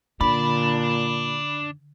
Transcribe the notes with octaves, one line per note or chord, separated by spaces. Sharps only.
A#2 D3 D4 D5 B5